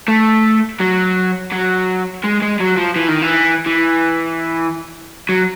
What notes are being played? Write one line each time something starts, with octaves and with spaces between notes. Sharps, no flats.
A3
F#3
F#3
G#3
G#3
F#3
F3
E3
D#3
E3
E3
F#3